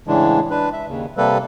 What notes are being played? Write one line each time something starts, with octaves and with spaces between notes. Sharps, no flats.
A2 C#3 E3 G#3 D4
D4 B4
E5
D#2 C#3
C3 G3 A#3 A4 B4